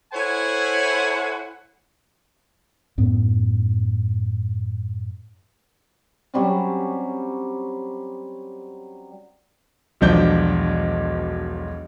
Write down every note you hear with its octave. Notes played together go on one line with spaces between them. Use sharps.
E4 A4 C5 C#5 F#5 G#5
F#2 A2 B3
F#3 G3 C4 C#4
E1 B1 F3 D4 G6